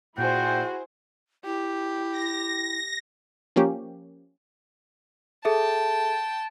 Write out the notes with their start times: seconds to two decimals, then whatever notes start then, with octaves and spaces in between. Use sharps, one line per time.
0.18 A#2 E4 F#4 G#4 C5 G5
1.45 E4 G4
2.12 A#6
3.56 F3 A#3 C#4 G4
5.45 G#4 A4 E5 G5 A5